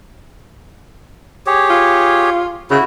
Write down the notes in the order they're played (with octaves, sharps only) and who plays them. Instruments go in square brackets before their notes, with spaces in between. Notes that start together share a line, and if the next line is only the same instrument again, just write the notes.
[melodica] G4 G#4 C#5
[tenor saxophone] F4
[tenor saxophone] C#3 [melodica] E4 F#4